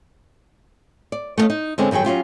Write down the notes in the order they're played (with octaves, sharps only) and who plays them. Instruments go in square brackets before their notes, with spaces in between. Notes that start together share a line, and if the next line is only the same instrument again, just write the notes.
[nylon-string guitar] D5
A3 B3 C#4 D#5 F5
D#4
D3 G#3 C4 C#4
G2 D#3 F#3 G#4 G5
F#3 C#4 F4 G4